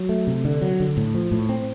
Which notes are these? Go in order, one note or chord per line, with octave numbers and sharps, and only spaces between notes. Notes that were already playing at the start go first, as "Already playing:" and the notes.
Already playing: F#3
A3
C3
D3
F#3
D3
A2
F3
A2
C4